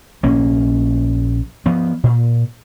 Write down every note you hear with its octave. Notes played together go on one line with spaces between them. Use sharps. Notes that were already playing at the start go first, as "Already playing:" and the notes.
A#1 A#3 C#4
F3 B3
A#2